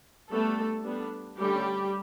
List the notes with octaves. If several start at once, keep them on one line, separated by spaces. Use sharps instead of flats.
G3 A3 B3 D4 A4
G3 B3 D4
D3 G3 A3 C#4 G4